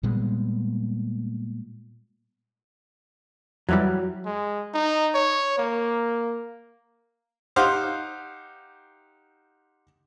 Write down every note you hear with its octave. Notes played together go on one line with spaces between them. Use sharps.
A#2 G3 G#3 B3
F2 E3 F#3 G3
G#3
D#4
C#5
A#3
D#4 G4 C5 F5 F#5